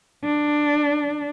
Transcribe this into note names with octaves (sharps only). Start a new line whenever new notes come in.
D4